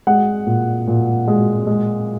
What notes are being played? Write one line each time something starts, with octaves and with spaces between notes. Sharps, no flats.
G#3 F#5
A#2
A#2
G#3
G#3